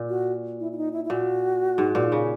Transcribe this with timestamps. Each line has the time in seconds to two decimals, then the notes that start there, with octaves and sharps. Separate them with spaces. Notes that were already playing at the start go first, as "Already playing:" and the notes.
Already playing: A#2
0.09 F#4
0.60 E4
0.72 E4
0.77 D#4
0.93 E4
1.05 E4
1.10 A#2 F#4
1.78 G#2
1.95 A#2
2.12 C#3